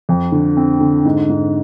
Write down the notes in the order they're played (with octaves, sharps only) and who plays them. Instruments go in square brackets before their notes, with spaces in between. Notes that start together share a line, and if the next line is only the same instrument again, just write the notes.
[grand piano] F2
D3
C4
D3
G#2
G#2